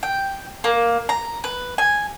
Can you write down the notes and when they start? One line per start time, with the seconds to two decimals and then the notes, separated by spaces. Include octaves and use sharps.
0.03 G5
0.64 A#3
1.09 A#5
1.44 B4
1.78 G#5